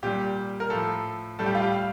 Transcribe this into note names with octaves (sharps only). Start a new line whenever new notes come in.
A#2 G3 G4
A#4
A2 F3 A4
A2 G3 A4
G4
F4
G4
F5